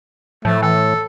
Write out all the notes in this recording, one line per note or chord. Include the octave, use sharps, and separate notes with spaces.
A2 F3 A3
E3 A4